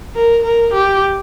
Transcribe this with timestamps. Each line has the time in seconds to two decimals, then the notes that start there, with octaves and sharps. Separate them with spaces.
0.15 A#4
0.43 A#4
0.73 G4